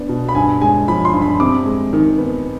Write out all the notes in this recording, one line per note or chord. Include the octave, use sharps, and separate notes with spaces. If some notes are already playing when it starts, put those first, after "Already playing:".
Already playing: B3 D4
B2
B5
G2 G#5
G#3 G#5
F3 B5
C6
G2
B5
C3 D6
G#3
D#3
B3